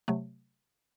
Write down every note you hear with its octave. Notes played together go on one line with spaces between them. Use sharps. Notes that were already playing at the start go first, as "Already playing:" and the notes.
C3 F#3 A3